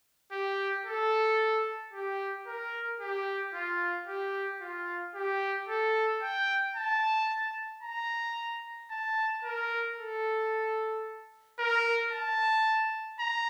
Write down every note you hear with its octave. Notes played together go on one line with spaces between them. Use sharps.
G4
A4
G4
A#4
G4
F4
G4
F4
G4
A4
G5
A5
A#5
A5
A#4
A4
A#4
A5
A#5